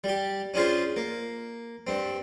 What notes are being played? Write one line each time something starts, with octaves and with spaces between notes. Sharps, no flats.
G3 G4
C#4 D4 F4 G#4 C5
A#3
G2 C4